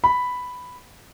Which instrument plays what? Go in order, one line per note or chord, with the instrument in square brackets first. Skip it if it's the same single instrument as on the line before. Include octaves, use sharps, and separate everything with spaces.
[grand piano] B5